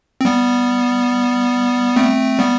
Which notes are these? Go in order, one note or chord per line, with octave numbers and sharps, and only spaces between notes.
C4
G3 B3
A3 C4
G3 B3